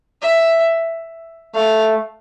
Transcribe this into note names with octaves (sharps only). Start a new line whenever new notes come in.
E5
A3 F5